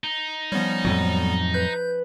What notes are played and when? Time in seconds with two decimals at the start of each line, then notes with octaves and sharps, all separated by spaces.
0.04 D#4
0.52 F3 G3 B3 C#4 C#5
0.85 F2 A2 F#3
1.54 B4 G6